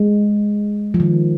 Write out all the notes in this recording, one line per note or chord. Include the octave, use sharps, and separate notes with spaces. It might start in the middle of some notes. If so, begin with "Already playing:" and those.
Already playing: G#3
F3
D#3